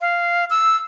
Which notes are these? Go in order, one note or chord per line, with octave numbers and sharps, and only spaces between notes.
F5
E6